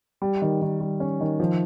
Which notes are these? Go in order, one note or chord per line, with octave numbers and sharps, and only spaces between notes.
G3
D#3
D#3
G3
C#4
D#3
F3